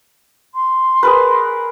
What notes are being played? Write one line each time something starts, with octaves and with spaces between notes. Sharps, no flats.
C6
G#4 A#4 B4